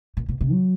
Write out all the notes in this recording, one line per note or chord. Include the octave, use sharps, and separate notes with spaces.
A#2
B2
C3
F#3